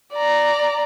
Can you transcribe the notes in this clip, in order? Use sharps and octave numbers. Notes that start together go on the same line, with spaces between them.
D5 A#5